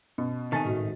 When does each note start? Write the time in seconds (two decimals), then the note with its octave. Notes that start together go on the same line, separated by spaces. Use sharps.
0.18 B2 C#4
0.52 C3 D#3 A3 D#4 G#5 A5 C#6 A6
0.64 G#1 A2 F#4